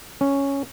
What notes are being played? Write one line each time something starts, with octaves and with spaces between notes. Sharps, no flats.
C#4